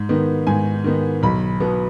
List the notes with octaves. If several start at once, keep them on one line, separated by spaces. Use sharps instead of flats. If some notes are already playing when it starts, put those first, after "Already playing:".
Already playing: G#2
D#3 B3
G#2 G#5
D#3 B3
B1 B5
B2 B3